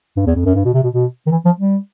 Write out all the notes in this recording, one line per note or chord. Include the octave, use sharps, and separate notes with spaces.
G2
E2
F2
F#2
G2
B2
C3
B2
B2
D#3
E3
F3
G3